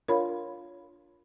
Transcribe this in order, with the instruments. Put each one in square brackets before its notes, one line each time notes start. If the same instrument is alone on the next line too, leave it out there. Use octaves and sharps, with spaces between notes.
[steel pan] D4 F4 [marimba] A#4 C#5 B5